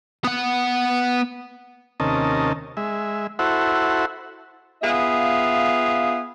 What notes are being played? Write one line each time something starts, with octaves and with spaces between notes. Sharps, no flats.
B3 F#5
D#2 C3 C#4 A#4 D#5 A5
G#3 E5
E4 F#4 A4 C5 E5 F#5
B3 F4 G#4 E5 F5